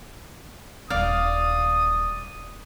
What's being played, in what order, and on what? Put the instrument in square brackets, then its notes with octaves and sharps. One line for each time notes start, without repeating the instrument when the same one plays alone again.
[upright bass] D#1 G#1 [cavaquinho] D5 F5 [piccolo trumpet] D#6